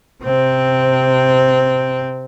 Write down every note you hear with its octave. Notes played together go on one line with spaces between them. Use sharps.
C3 C4